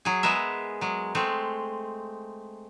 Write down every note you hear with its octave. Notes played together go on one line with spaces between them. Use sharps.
F#3 G#4
G#3 B3 A#4 E5
F#3 G#3
G#3 A3 C4